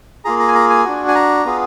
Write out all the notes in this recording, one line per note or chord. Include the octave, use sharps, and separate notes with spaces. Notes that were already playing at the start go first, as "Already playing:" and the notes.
A#3 F4 G#4 A#5
A#5
G#5
A#5
G#5
D4 F#4
G#5
A#5
B3 F4 G#4